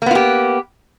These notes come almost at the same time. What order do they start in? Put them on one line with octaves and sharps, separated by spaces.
A#3 B3 F4 G4